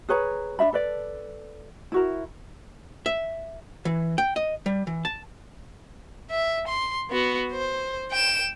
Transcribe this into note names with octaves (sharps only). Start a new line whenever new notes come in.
G#4 B4 C#5 A#5
D4 F#4 E5 B5
A4 B4 D5
E4 F#4 A#4
E5
E3
G5
D#5
G3
E3
A5
E5
C6
B3 F#4
C5
G5 E7